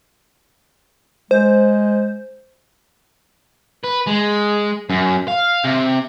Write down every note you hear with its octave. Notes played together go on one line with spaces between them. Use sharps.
G#3 C5
B4
G#3
F#2
F5
C3